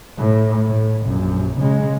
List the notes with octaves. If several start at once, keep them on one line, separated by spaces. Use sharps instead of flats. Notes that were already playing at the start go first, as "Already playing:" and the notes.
A2
A2
A#1 F#2
C#3 G#3